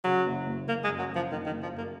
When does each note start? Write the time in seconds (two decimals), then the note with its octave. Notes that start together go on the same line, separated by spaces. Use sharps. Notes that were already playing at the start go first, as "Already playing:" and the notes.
0.04 C#3 F#3
0.26 F#1
0.47 F#1
0.67 F#1 A#3
0.84 G#3
0.89 F#2
0.99 F#3
1.10 F#1
1.16 F3
1.31 F#1 D#3
1.46 D#3
1.51 F#1
1.63 F3
1.73 F#2 A#3